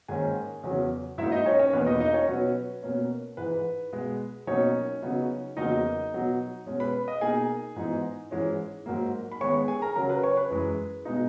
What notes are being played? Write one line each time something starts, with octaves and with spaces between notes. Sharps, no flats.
G#2 D#3 A#3 C#4 G#4 G#5
E2 C#3 F#3 C#4
G#2 F#3 A#3 D#4 E4 E5
D#4 D#5
C#4 C#5
C#4 C#5
E2 B2 A#3 B4
D#4 D#5
D#4 D#5
C#4 C#5
B2 F#3 C#4 B4
B2 A#3 C#4
G#2 E3 G#3 B4
B2 G#3 B3
B2 F#3 A#3 C#4 D#4 C#5
C#3 F#3 B3 D#4
E2 C#3 F#3 A#3 D#4 D#5
B2 F#3 B3
B2 G#3 C#4
B4 B5
D#5 D#6
B2 A#3 D#4 G#4 G#5
G#2 E3 B3 D#4
G#2 E3 G#3 C#4
G#2 F#3 A#3
B5
D#3 G#3 B3 C#5 C#6
G#4 G#5
A#4 A#5
C#3 F#3 C#4 A#4 A#5
B4 B5
C#5 C#6
B4 B5
F#2 E3 G#3
B2 G#3 B3 D#4